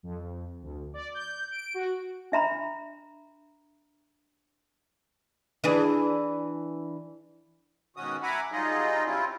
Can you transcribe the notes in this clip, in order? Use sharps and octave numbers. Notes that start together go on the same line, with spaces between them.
F2
D2
D5
G6
D7
F#4
D4 E5 A#5 B5
E3 D4 G#4
G#2 B2 D#3 C#4 F#4 D#6
E5 F#5 G#5 A#5 B5 D6
F#3 G3 D#4 F4 G#4 D#5
C3 C4 C#4 E4 F4